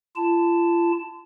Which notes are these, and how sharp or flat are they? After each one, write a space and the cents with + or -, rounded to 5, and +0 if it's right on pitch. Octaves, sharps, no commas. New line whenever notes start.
F4 -40 A5 +0